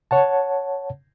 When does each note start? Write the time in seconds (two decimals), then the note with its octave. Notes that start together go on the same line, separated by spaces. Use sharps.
0.11 C#5 F#5 A5